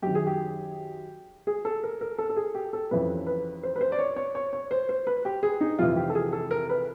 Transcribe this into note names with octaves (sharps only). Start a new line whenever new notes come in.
F#2 D#3 G4
G#4
G4
G#4
A4
A#4
A#4
A4
A4
G#4
G4
A4
F2 C#3 E3 B4
B4
C5
B4
C5
D5
C#5
C#5
C#5
C#5
C5
C5
B4
G4
G#4
D#4
F2 C3 E3 F4
G4
A4
G#4
A4
A#4
B4